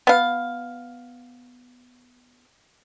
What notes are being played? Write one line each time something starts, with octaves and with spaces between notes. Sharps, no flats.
B3 F5